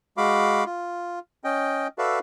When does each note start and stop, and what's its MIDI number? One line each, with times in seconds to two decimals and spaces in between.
0.17 0.64 56
0.17 0.64 66
0.17 0.64 77
0.17 0.64 83
0.17 0.64 86
0.65 1.19 65
1.44 1.87 61
1.44 1.87 75
1.44 1.87 79
1.98 2.19 66
1.98 2.19 69
1.98 2.19 71
1.98 2.19 74
1.98 2.19 76
1.98 2.19 77